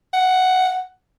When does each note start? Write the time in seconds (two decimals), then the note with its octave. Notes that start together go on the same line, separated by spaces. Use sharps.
0.13 F#5